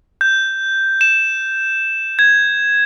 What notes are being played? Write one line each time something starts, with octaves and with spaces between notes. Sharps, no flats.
G6
E7
G#6